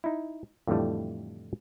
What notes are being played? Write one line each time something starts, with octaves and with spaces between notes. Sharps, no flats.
D#4 E4
F2 A2 D3 E3 G3 A3